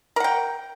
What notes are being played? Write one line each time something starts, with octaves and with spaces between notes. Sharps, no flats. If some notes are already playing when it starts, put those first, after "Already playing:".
A#4 F#5 G5